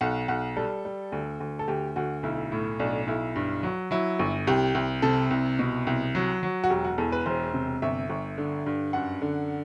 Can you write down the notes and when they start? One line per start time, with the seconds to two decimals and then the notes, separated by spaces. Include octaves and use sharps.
0.01 B1 F#5
0.28 B1 F#5
0.57 G3 A4
0.85 G3
1.12 D2
1.40 D2
1.59 A4
1.68 D2 G4
1.96 D2 F#4
2.23 B1 E4
2.52 A2
2.80 B1 D4
3.07 B1 E4
3.36 G2
3.63 F#3
3.91 F#3 E4
4.19 G1
4.47 C2 G4
4.75 C2
5.02 C3 A4
5.31 C2
5.59 B2
5.87 C2
6.15 F#3
6.43 F#3
6.64 F#4
6.70 E1 G4
6.84 F#4
6.98 E2 A4
7.12 B4
7.26 E1 C5
7.54 C3
7.82 G1 E5
8.09 G1
8.38 D3
8.66 G2
8.93 F#2 F#5
9.22 D3